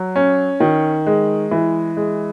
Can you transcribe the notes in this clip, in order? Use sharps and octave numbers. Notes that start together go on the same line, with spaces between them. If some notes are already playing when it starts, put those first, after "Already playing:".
Already playing: F#3
C#4
D#3
G#3
E3
G#3